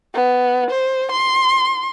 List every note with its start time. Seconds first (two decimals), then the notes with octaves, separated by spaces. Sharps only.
0.15 B3
0.71 C5
1.12 C6